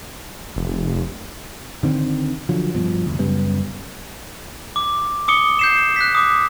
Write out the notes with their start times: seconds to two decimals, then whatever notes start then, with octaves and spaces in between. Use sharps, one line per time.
0.56 F1
1.83 D3 D#3 C4
2.49 D3 F3 F#3
2.75 G2 B2 F3
3.06 F1 D2
3.19 F#2 C#3 G3 B3
4.76 D6
5.28 D6 D#6 C#7 G7
5.59 G6 C7 E7
5.96 F#6 B6
6.15 D6 D#6